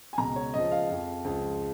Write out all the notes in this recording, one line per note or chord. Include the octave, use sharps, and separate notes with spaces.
G#5
C#2 B2 A#5
C#5
C#2 C#3 F3 D#5
F5
F2 F3
C#2 C#3 F3